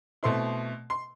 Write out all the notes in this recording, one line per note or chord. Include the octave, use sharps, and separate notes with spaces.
B2 A3 C4 E4 C6
C6